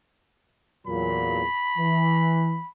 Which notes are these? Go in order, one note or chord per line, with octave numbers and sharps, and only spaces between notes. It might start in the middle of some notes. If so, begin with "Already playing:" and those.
E2 A#2 F#3 B5
E3